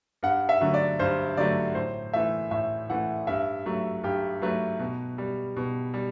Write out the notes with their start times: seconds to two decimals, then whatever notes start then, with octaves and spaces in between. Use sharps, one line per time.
0.23 G2 F#5
0.49 E5
0.61 D3 F#3 A3
0.74 D5
0.99 G2 C5
1.37 D3 F#3 A3 D5
1.75 A2 C5
2.13 E3 A3 E5
2.51 A2 E5
2.90 E3 A3 F#5
3.27 G2 E5
3.66 F#3 A3
4.03 G2 G4
4.42 F#3 A3 B4
4.79 B2
5.18 G3
5.56 B2
5.94 G3